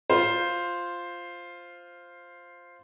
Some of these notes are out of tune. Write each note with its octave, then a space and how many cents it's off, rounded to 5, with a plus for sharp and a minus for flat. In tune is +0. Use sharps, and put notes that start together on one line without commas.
F4 +0 C5 +0